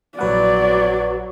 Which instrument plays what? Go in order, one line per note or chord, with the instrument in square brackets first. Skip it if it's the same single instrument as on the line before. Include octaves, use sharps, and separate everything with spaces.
[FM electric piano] A#1 B4 F#5 [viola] F#3 [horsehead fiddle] D5